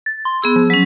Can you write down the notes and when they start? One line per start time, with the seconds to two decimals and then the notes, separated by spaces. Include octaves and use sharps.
0.06 A6
0.25 C6
0.42 B3 G#4 E6
0.56 F3
0.70 F#3 C#4